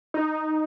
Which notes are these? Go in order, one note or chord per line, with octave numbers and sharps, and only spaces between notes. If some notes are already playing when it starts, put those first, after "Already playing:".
D#4